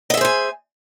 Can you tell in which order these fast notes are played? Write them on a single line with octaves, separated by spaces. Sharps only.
D#5 E5 G#4 C5 G#5